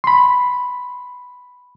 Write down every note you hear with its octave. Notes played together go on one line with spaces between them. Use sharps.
B5 C6